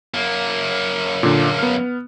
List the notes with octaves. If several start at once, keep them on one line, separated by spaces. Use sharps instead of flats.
F#2 A#3
A#2 D3
B3 F6